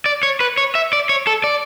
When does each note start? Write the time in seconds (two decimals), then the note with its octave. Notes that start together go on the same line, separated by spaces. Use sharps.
0.06 D5
0.23 C#5
0.40 B4
0.58 C#5
0.75 E5
0.93 D5
1.09 C#5
1.27 A4
1.44 D5